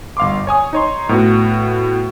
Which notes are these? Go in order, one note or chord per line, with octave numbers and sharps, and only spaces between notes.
G1 F5 C6 D6
C#5 G#5 D#6
D#4 C#5 C6
A2 B3 F#4